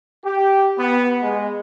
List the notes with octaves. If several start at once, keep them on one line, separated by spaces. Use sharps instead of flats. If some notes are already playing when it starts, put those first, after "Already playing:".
G4
B3
G#3